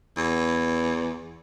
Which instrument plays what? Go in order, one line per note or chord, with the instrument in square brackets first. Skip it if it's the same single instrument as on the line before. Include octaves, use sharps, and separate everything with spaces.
[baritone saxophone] E2